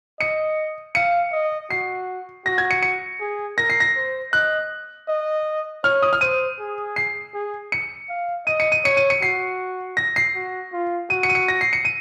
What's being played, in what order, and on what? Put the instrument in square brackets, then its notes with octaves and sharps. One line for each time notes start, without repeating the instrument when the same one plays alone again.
[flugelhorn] D#5 [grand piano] C#7
[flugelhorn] F5 [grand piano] C#7
[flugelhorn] D#5
[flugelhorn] F#4 [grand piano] C7
[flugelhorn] F#4 [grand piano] A#6
[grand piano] G#6
C#7
C#7
[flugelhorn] G#4
[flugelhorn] A#4 [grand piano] A#6
[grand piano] C7
A#6
[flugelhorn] C5
[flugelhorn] D#5 [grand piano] F#6
[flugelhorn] D#5
[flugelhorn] C#5 [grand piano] F6
[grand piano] D#6
F6
[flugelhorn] C5 [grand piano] D#7
[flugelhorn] G#4
[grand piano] C7
[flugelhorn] G#4
[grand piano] C#7
[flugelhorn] F5
[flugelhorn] D#5 [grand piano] D#7
[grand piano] C#7
D#7
[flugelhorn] C#5 [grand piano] C#7
[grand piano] D#7
C#7
[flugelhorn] F#4 [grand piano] C7
[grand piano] A#6
C7
[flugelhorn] F#4
F4
[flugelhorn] F#4 [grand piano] D#7
[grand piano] C#7
D#7
C#7
A#6
C7
C#7
D#7